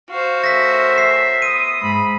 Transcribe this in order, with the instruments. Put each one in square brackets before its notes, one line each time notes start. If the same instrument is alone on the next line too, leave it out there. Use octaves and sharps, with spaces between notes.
[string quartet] F#4 C5 [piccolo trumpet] F5
[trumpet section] A3 C#4 A#4 [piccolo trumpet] E5 [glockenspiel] A#6 B6
[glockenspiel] C7
[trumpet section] B3 C6 D#6 [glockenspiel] D#7
[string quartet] G#2 [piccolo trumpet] B5